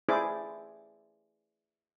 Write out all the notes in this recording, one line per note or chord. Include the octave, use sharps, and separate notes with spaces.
E4 G#4 C5 D5 D6